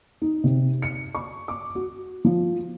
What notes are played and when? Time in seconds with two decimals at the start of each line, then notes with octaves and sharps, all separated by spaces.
0.22 D#4
0.44 C3
0.82 C#7
1.15 C#6
1.48 D6
1.75 F#4
2.25 F3